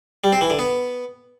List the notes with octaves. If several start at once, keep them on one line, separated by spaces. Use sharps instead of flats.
G3
C4
E3
D3
B3